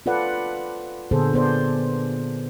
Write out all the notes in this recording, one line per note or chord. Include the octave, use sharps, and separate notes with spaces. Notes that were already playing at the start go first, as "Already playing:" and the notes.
F4 A4 B4 D5 F#5
A#2 D3 B3 G#4 A4 C5
B3 C5 D5